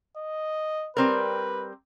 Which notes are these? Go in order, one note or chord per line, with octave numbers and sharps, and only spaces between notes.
D#5
G3 C4 A#4 B4